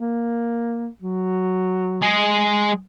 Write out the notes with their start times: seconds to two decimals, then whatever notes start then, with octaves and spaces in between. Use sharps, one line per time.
0.01 A#3
1.02 F#3
2.02 G#3 G#4